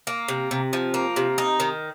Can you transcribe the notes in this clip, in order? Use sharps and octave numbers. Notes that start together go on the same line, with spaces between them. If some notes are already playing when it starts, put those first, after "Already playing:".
A#3
C3
C3
F3
A#3
C3
D#4
D#3